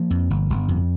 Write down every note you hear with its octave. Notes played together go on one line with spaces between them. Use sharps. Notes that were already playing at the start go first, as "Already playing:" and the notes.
Already playing: F3 A#3
F2
G1
G1
F2